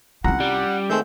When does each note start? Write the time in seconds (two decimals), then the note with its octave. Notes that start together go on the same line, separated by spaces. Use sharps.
0.24 C2 C#4 F4 F#5 A#5
0.40 G3
0.90 D#3 G#3 A3 C4 E6 G6